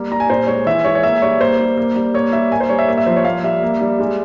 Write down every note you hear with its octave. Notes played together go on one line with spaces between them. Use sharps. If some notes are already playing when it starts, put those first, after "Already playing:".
Already playing: G3 A#3
G3 A#5
G#5
A#2 C5
G#3 C#5
E3 E5
G#3 C#5
C#5
A#3 E5
G3 C#5
A#3 C5
G3
A#3
G3
A#3 C#5
G3 E5
A#3 G#5
C5
G3 C#5
E5
A#3
E5
F3 C5
C#5
A#3 F5
G3 E5
A#3
G3
G#3